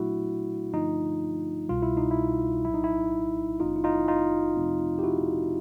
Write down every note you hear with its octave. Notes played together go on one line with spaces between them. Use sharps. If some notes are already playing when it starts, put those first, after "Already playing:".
Already playing: A#2 F#3 A3 D4 E4 F#4
G2 D3 F3 A3 D4 D#4 F4
C2 B2 G3 F4
E4
D#4
E4
A#1 A2 F#3 E4
D#4
E4
G#1 G2 E3 A3 C#4 D#4 F4
E4
D#4 F4
D#4 F4
F2 C3 F3 A3 C4
G4
E4 F#4